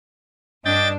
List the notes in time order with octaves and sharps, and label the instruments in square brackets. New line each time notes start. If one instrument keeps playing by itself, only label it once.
[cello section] G2 D4 [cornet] D#5 [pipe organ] G5 A6